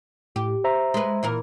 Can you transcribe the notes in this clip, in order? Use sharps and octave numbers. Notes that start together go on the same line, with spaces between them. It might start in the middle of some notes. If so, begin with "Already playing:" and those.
A2 G4
C5 E5 A#5
G#3 B4
A#2 E3 A#4